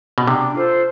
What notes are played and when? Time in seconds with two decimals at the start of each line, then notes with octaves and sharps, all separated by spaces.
0.18 B2
0.27 C3 D4
0.54 F4 A4 C5